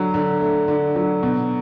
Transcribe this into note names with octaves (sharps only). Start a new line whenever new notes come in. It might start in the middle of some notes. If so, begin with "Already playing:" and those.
Already playing: D3 F#3
D3
A3
D3
F#3
B2